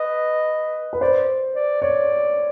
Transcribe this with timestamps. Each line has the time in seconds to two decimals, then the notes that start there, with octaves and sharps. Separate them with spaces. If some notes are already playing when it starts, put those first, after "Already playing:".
Already playing: B4 D#5
0.93 B4
1.01 C5 D5
1.55 D5
1.82 C#5 D5